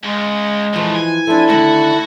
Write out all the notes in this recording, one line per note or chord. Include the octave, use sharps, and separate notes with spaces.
C#2 G#3
G#2 E3 F3 A3
G#5
F3 D4 E4 A4
D3 D#3 A3 F#4 F#5